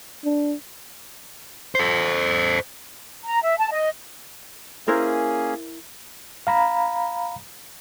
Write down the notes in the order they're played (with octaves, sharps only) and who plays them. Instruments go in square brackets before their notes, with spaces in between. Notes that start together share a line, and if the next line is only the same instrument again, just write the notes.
[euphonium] D4
[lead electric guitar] A4 C5
[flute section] A#5
E5
A5
D#5
[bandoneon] A#3 C#4 G#4 [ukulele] E4 A#4 C5
[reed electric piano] F5 A#5 B5